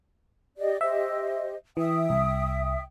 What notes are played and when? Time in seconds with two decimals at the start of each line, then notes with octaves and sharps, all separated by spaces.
0.57 G4 D5 D#5
0.81 G4 C5 D#5 E5
1.77 E3 E5 G5 D#6
2.10 C2